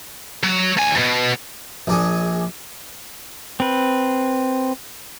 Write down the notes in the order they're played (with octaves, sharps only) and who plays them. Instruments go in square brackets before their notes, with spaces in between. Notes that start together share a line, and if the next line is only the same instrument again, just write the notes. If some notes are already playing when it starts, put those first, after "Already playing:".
[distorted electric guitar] F#3
D2 G#5
D2 B2
[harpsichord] A#1 D4 G#4
[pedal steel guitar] C4 B4